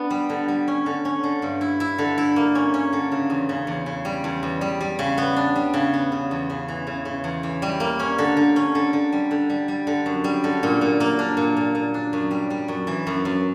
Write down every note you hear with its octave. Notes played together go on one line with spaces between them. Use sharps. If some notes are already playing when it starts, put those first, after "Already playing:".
Already playing: B3 D4
G3
D3
G3
C#4
D3
C#4
D3
G2
E4
E4
D3
E4
A#3
C#4
C#4
D3
C#3
E2
C#3
E2
C#3
G3
E2
E2
G3
G3
C#3
B3
D4
G3
C#3
B3
C#3
E2
C#3
E3
C#3
C#3
E2
E3
G3
A#3
C#4
D3
D3
C#4
D3
D3
G3
D3
G3
G3
D3
F#2
G3
D3
A#2
A#2
A#3
D4
A#2
A#2
A#2
D4
F#2
G3
G3
F#2
E3
F#2
F#2